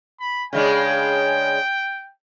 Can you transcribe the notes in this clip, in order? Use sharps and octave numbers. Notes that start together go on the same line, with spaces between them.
B5
C#3 G#3 D4 G5